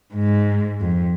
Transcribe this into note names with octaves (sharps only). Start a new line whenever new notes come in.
G#2
F2